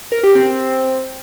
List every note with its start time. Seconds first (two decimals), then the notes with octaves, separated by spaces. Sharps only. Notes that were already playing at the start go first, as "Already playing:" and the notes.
0.12 A#4
0.23 G4
0.35 C4